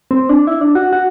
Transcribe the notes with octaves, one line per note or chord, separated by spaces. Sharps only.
C4
D4
E4
D4
F#4
F#4